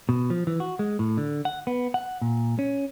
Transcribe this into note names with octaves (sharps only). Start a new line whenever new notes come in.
B2
F3
E3
F#4
G#3
A2
D3
F#5
B3
F#5
A#2
C#4